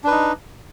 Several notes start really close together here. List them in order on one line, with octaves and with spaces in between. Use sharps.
D4 B4 D#4